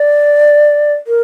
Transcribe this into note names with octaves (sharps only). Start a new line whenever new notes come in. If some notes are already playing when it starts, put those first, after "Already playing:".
Already playing: D5
A#4